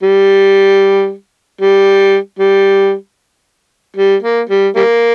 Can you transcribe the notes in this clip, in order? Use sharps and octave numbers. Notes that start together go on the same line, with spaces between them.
G3
G3
G3
G3
A#3
G3
G3 A#3